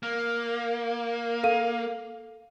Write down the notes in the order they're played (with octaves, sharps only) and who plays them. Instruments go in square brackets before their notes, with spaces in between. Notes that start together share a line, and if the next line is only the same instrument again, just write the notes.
[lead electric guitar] A#3
[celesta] A4 F5 D#7